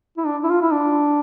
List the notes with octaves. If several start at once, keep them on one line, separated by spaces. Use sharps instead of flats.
E4
D4
E4
F4
E4
D4